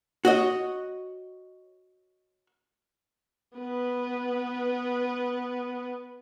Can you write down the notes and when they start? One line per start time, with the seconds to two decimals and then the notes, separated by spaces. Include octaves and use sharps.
0.25 F#4 C#5 D#5
3.58 B3 B4